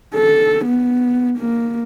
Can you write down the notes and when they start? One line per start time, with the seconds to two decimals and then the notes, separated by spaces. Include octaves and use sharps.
0.15 A4
0.65 B3
1.38 A#3